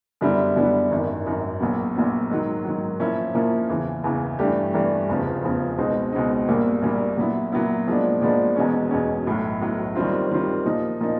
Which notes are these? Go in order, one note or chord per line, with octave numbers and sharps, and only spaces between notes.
F#2 D3 G3 B3 E4
F#2 D3 G3 B3 E4
G#1 F#2 D#3
G#1 F#2 D#3
A#1 A#2 F#3 B3
A#1 A#2 F#3 B3
G#2 D#3 F#3
G#2 D#3 F#3
A#2 F3 A#3 C#4 E4
A#2 F3 A#3 C#4 E4
E2 C#3 E3
E2 C#3 E3
G2 E3 A3 D4 G4
G2 E3 A3 D4 G4
F1 E2 C#3 F3
F1 E2 C#3 F3
C#2 B2 G#3 C4 D#4
C#2 B2 G#3 C4 D#4
A#1 A#2 G3 A#3
A#1 A#2 G3 A#3
A#2 F#3 B3 E4
A#2 F#3 B3 E4
A#2 F3 G#3 B3 D4
A#2 F3 G#3 B3 D4
E1 E2 B2 G#3 C#4
E1 E2 B2 G#3 C#4
B1 A2 F#3
B1 A2 F#3
D#2 D#3 G3 C4 F4
D#2 D#3 G3 C4 F4
A#2 F3 A#3 D#4
A#2 F3 A#3 D#4